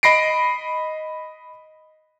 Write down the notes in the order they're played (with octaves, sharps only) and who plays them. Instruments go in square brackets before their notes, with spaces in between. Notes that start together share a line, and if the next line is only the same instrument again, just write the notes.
[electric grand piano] D#5 B5 A#6 C7 D7